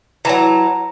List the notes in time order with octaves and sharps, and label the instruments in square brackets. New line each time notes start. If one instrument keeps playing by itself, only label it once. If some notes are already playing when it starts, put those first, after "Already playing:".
[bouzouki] E3 F#3 [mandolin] A5 A#5